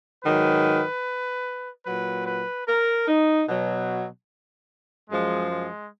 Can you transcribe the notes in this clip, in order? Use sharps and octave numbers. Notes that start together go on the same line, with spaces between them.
G#2 D#3 F#3 B4
A#2 F#3 B4
B4
A#4
D#4
B2 F#3
F#2 F3 G#3
G#3